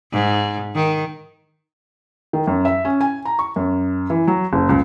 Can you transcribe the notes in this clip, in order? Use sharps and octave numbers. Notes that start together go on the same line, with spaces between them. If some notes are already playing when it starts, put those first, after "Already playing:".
G#2
D#3
D#3
F#2
E5
C#4
G#5
A#5
C#6
F#2
E3
F#3
F#1
C#2